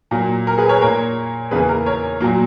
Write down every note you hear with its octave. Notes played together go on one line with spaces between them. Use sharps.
A#2 F#3 A#3
A#4
G#4 B4
A#4 C#5
A#2 A#3 A#4 C#5
E2 C#3 E3 A#3 G#4 B4
A#4
A#4 C#5
A#2 F#3 A#3